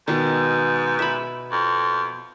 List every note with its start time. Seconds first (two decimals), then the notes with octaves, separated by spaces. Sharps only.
0.08 G#2 B2 D#3
0.99 E5 B5
1.52 F2